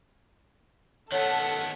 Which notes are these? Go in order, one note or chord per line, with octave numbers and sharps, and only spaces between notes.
D#3 B3 A4 C#5 F#5